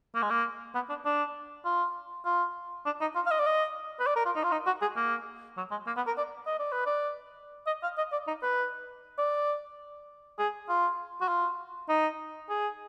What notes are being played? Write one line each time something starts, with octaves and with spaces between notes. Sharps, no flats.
A#3
G#3
A#3
B3
D4
D4
F4
F4
D4
D#4
F4
F5
D#5
D5
D#5
B4
D5
A#4
F4
D#4
F4
D#4
F#4
G#4
A#3
F#3
G#3
A#3
B3
A#4
D5
D#5
D5
B4
D5
D#5
F5
D#5
D5
D#4
B4
D5
G#4
F4
F#4
F4
D#4
G#4